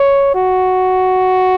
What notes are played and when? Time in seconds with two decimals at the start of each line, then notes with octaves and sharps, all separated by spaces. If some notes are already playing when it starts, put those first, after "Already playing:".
Already playing: C#5
0.35 F#4